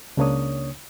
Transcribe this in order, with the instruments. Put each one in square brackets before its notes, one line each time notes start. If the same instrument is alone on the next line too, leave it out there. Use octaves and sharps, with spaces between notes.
[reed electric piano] C#2 C#3 A#3 D4 C#5 D#6